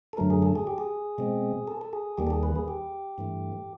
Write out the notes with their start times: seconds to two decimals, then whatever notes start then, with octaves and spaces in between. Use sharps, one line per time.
0.13 A4
0.17 F#2 D3 F#3 A3 A#4
0.30 G#4
0.42 A4
0.56 G#4
0.67 G4
0.78 G#4
1.18 B2 G#3 C4
1.68 A4
1.81 A4
1.93 G#4
2.18 D#2 D#3 G3 A#3 G4
2.27 A4
2.30 G#4
2.43 B4
2.56 G#4
2.68 G4
3.18 G2 E3 A3